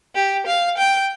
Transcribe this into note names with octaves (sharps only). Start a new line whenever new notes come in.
G4
F5
G5